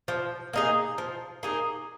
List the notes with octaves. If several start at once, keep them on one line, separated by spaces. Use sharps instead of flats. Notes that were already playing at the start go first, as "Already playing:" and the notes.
F3
A#3 D#4 G#4
F3
A#3 D#4 G#4